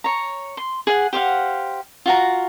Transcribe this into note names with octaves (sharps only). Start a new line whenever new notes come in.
C#5 A#5
C6
G#4 F#5
G4 C5 F5 F#5
F4 F#4 A#5